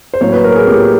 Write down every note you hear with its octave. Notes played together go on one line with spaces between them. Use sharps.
C5
A2 F#3 A#3 C#5
B4
A#4
G#4
A2 F#3 A#3 G4